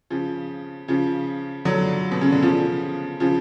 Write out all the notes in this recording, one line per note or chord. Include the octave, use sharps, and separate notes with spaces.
C#3 F3
C#3 F3
D3 F#3
B2
C#3
D3
C#3 F3
C#3 F3